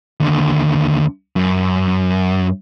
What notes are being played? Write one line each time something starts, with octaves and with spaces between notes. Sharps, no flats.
D#2 D3
F#2